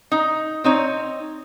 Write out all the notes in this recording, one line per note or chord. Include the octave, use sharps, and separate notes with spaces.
D#4
C4 D#4 C#5